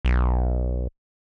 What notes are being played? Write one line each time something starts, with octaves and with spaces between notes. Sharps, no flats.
B1